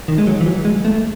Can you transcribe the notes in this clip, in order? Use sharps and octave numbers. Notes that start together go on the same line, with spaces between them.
D#3
G#3
F#3
E3
F#3
G#3
A3